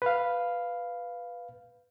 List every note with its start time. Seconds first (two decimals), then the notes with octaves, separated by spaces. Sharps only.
0.02 B4 F5